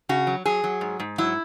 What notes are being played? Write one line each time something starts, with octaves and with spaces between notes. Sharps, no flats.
C#3 F#4
F#3
F#3 G#4
F#3
G#2
G#2
F#3 E4